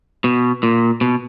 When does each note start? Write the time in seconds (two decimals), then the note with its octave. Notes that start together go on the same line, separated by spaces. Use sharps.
0.24 B2
0.63 A#2
1.01 B2